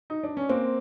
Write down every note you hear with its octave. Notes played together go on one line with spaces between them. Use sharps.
D#4
D4
C#4
A#3 C4 C5